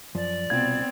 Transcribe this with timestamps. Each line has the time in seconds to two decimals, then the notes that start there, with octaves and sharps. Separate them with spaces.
0.15 F#2 F3 D5
0.50 C2 B2 B3 C4 F4 G#6